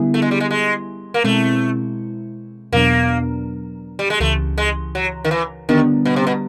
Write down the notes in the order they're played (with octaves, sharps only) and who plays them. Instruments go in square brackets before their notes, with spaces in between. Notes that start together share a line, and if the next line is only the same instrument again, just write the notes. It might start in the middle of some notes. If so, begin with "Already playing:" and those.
Already playing: [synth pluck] D3 G3 B3 E4 G#4
[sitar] A3
G#3
G3
G#3
G#3
A#3
[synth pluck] B2 G#3 C4 E4 [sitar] A3
[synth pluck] E2 B2 F#3 B3 D4 [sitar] A#3
[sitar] G3
G#3
[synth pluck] C#2 C#3 E3 [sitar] A3
[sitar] G#3
F#3
D#3
E3
[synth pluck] D3 G3 B3 D4 [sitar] D#3
[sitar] B2
C3
B2